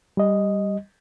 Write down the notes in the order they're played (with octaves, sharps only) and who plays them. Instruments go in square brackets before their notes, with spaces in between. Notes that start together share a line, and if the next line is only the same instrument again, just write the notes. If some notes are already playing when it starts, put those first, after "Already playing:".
[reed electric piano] G3 D#5